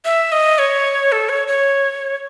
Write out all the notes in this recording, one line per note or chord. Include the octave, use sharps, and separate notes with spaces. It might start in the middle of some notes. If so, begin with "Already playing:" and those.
E5
D#5
C#5
A4
C#5
C#5